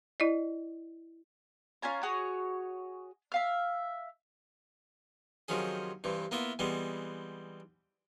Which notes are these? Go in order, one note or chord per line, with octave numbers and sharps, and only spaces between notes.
E4 D5 D#5
C#4 F4 G#5 A#5
F#4 G#4 C#5 D#6
E5 F5 F6
C3 D#3 F3 F#3 C#4 G#4
G2 C3 E3
A#3 B3 E4 F4 E5
E3 G3 G#3 B3 C4